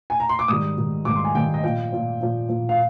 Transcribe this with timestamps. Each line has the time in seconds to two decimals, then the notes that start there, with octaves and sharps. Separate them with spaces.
0.10 G#5
0.20 A#5
0.29 C6
0.39 D6
0.48 G#2 D#3 G3 D#6
0.77 G#2 D#3 G3
1.05 G#2 D#3 G3 D6
1.16 C6
1.25 G#5
1.35 G#2 D#3 G3 G5
1.54 D#5
1.63 A#2 F3 G5
1.92 A#2 F3
2.21 A#2 F3
2.48 A#2 F3
2.69 F5